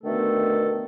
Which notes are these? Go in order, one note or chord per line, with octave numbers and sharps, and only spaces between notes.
B2 D3 D#3 A3 B3 A4